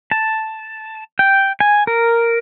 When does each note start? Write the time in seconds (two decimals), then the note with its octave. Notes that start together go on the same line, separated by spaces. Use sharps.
0.11 A5
1.19 G5
1.60 G#5
1.87 A#4